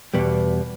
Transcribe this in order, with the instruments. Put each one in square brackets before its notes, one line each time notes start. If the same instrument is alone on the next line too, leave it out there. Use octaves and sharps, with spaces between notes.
[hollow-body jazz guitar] E2 B2 G3 B3